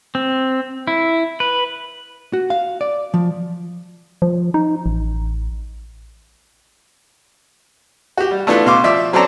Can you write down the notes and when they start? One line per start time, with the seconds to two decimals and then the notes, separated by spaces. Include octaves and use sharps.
0.15 C4
0.87 E4
1.40 B4
2.33 F#4
2.50 F5
2.81 D5
3.14 F3
4.22 F3
4.54 D#4
4.86 A1
8.18 F#4 G4
8.31 G3
8.47 A3 B3 D4 E4 F4 A4
8.66 B2 F5 C6 D6
8.84 F3 D5 E5
9.13 F#3 C4 C#4 A4 D5 A#5